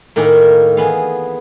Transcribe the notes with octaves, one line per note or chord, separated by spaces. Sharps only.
A2 D#3 A#3 A#4
E3 B3 G#4 F5